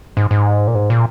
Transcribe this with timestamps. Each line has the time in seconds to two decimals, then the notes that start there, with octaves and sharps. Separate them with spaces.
0.17 G#2
0.31 G#2
0.67 A#2
0.75 G#2
0.90 A#2